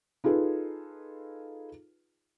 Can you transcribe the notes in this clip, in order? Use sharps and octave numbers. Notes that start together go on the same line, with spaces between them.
D#4 F4 G#4 A4 B4